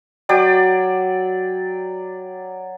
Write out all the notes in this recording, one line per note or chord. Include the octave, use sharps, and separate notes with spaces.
F#3 D5 G5